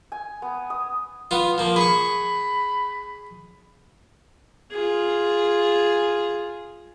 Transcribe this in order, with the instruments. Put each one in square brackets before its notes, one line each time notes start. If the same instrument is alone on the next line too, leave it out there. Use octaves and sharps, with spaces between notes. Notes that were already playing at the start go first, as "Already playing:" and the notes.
[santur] G#5
B3
D#6
[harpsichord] B3 F4
F3 A#3
[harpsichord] G#4 C#6 [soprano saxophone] B5
[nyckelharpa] F4 G#4